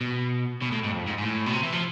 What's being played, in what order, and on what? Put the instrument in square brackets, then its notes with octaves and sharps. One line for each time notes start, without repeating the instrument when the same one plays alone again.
[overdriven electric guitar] B2
B2
A2
G#2
F2
G#2
G#2
A2
B2
C3
E3
F3